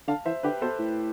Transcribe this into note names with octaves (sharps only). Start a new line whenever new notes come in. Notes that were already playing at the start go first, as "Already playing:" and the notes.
D3 F5 A5
E3 C5 E5
D3 G4 B4
B2 A4 C5
A2